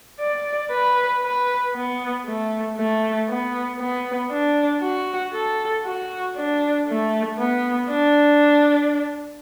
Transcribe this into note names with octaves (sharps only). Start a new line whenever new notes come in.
D5
B4
B4
B3
A3
A3
B3
B3
D4
F#4
A4
F#4
D4
A3
B3
D4